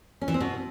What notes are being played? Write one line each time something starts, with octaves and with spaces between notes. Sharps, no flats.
C#4
E3
C4
B2